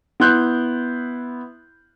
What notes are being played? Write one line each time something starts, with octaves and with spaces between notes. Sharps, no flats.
B3 E4 C6 F#6 G6